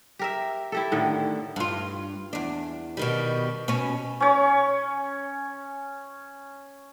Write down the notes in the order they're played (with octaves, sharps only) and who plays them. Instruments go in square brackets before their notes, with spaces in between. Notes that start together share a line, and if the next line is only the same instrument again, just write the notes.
[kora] G4 A#4 E5
E4 G4 A4
A2 D3 D#3
[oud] G2 F4
E2 D4
B2 D#3 G3
B2 C#4
[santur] C#4 C#5